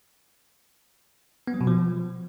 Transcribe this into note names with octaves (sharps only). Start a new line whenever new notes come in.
B3
F#3
B2
F3